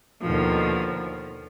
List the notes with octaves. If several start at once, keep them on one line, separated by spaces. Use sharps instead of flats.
D#2 B2 D3 D#3 F3